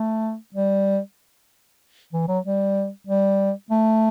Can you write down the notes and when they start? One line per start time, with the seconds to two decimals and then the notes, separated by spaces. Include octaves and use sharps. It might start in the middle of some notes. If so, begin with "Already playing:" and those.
Already playing: A3
0.54 G3
2.13 E3
2.28 F#3
2.45 G3
3.07 G3
3.71 A3